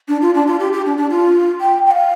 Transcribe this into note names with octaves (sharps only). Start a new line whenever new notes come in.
D4
F4
D4
F4
G4
G4
D4
D4
F4
G5
G5
F5